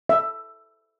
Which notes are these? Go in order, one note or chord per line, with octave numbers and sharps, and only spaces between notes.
E5